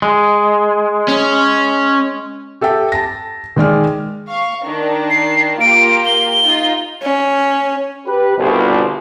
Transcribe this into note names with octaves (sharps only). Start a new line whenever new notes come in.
G#3
C#4
G4 A4 E5 G5
A5 A#6
D#3 G#3 D5 F6
F5 C#6
D#3 D4
C7
A#3 F4 G4 D7
G7
D#4 F4
C#4
G4 B4
G1 C2 B2